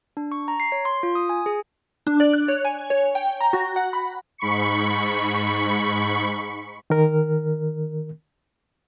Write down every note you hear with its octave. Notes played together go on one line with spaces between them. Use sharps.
D4
C#6
A#5
C7
C#5
C6
F4
D#6
G#5
G#4
D4
D5
F#6
C#5
G#5
C#5
G5
A#5
F#4
F#5
B5
G#2 B5 C#6 C#7
D#3 A#4